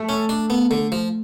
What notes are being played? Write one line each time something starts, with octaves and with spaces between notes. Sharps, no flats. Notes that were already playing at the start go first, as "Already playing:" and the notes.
Already playing: A3
C#4
D4
B3
D3
F3